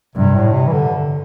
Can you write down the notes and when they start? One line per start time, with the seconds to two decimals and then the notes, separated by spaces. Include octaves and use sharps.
0.15 G2 C3
0.34 A2
0.54 C3
0.67 E3
0.73 D3